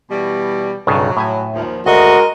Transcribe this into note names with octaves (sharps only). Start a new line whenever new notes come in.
B2 E3 G3
B1 G2 C#3 F#3
A2 E5 G#5
D#2 A#2 F3
D2 G#3 F#4 A#4 D#5